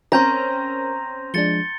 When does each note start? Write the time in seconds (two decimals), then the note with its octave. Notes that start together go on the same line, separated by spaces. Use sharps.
0.12 C4 C#4 A#4 A#5 C6 G6 A#6
1.34 F3 G#3 D4 A6 C#7 G7